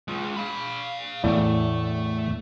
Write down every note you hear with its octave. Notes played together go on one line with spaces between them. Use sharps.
G#3 F4
F5 B5
E2 A2 A3 D5